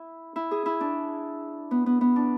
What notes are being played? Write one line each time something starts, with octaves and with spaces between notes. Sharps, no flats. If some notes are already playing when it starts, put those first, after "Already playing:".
Already playing: E4
E4
G#4
E4
D4
B3
B3
B3
D4